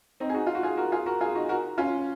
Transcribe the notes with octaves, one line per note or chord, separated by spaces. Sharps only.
C4 D#4
G#4
D#4 F#4
F4
F#4
F4 G#4
F#4 A#4
F4 G#4
F#4 A#4
F4 G#4
D#4 F#4
F#4 A#4
C#4 F4